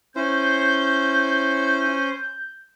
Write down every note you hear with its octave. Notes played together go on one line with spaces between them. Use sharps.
C#4 E4 C5 G6